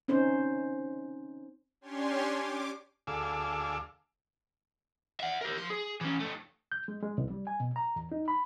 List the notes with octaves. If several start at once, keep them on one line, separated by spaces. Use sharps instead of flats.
C4 C#4 D#4 C5
C#4 D4 G4 C#5 G#5 C6
D6
D2 G#4 A4 F5 D6 E6
E5 F#5
G4 A#4
F3 C6
G#4
E3 C#4
F2 A3
G6
G#3
G#3
C2
G3
G#5
B2
A#5
E2
D#4
B5